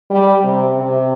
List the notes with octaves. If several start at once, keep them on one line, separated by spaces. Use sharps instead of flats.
G3
C3
C3